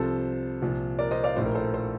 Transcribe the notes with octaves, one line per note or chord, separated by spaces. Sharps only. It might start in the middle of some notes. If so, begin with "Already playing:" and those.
Already playing: C2 C3 F3 A4 C5
C2 A#2 F3
A#4 D5
C5 D#5
D5 F5
A#1 A2 F3 C5
A#4
A4 C5
A4 C5